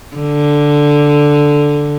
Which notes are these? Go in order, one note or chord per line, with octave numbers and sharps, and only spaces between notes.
D3